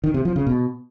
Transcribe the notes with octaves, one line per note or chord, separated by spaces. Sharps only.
D#3
C3
F3
C#3
B2